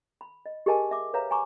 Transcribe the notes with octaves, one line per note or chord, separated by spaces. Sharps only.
B5
D#5
G4 G#4 A#4 D#5 G#5 A5
E5 D6
B4 C#5 E5 F5 A#5
G#5 A#5 C#6 D6